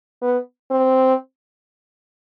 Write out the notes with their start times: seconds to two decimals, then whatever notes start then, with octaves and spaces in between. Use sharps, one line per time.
0.22 B3
0.71 C4